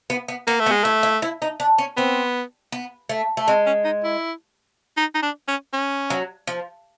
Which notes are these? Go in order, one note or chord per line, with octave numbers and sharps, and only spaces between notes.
B3
B3
A#3 B3
A3
B3
G#3
A3 E4
E4
E4
D#4
D4
C#4
B3 C4
B3
A3
A3
G#3 C4
C#4
D#4
E4
D#4
D#4
D4
C#4
C#4
F#3
F3